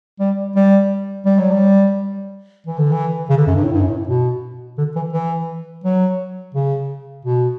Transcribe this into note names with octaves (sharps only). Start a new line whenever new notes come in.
G3
G3
G3
F#3
G3
E3
D3
E3
C#3
D3
F#2
G2
A2
G2
F#2
A2
B2
D3
E3
E3
F#3
C#3
B2